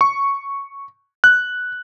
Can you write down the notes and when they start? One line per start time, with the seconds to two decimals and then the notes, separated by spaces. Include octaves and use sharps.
0.01 C#6
1.24 F#6